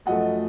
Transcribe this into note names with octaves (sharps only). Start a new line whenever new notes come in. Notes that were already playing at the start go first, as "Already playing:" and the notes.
F#2 F3 A3 D#5 F#5